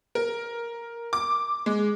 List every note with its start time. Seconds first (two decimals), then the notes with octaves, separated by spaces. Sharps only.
0.15 A#4
1.13 D6
1.66 G#3